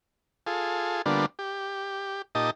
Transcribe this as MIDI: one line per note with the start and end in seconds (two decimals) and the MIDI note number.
0.47 1.02 65
0.47 1.02 68
0.47 1.02 69
1.06 1.26 50
1.06 1.26 55
1.06 1.26 58
1.06 1.26 59
1.06 1.26 62
1.06 1.26 65
1.39 2.22 67
2.35 2.51 46
2.35 2.51 63
2.35 2.51 67
2.35 2.51 75
2.35 2.51 81